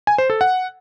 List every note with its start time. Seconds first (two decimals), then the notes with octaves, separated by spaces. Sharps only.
0.07 G#5
0.18 C5
0.30 A4
0.41 F#5